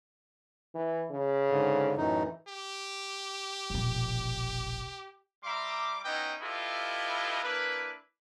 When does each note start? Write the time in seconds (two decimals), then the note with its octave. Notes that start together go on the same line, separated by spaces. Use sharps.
0.75 E3
1.10 C#3
1.50 G#2 D3
1.97 F#2 A2 E3 D#4
2.48 G4
3.70 E1 A#1
5.44 G3 E5 A#5 C6 D6
6.04 B3 C#4 D#4 E4 D#5 G5
6.41 E4 F4 G4 A4 B4 D#5
7.43 A#3 D4 E4 B4